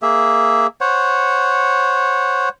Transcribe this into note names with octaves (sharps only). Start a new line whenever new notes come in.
A#3 G#4 E5
C5 C#5 F#5